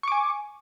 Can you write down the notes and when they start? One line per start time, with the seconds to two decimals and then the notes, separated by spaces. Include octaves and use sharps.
0.03 C#6
0.08 D6
0.12 G#5